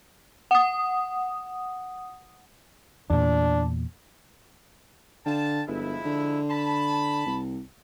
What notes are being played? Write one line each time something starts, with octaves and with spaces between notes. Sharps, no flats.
F#5 D#6
E2 A#2 D4
D3 F5 G5 A5
G1 F3 G#3 E4
D3
A5 B5
C2